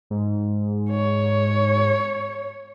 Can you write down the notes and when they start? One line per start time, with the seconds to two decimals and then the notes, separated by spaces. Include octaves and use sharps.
0.10 G#2
0.91 C#5